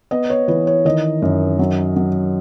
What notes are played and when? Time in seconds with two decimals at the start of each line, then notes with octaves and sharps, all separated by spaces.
0.11 B3 D#5
0.30 C#5
0.48 E3 B4
0.67 C#5
0.85 D#3 D#5
1.22 F#2
1.59 F#3
1.96 F#3